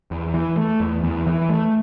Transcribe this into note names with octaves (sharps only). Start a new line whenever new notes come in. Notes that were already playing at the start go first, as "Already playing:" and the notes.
E2
E3
A3
E2
E2
E3
A3